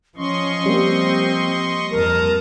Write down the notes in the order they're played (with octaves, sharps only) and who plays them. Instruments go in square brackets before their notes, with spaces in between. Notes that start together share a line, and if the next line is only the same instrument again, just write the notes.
[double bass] F3 [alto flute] C#4 [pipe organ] D#5 C6 C#6
[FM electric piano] G3 A#3 [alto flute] C4
[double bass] F2 [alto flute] A#4 [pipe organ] A5 A#5 D#6